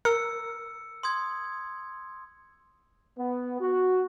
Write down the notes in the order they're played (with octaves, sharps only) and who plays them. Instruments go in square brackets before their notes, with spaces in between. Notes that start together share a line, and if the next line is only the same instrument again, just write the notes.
[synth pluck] A#4 [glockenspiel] E6 C#7
[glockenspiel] C6 D#6 G#6
[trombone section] B3
F#4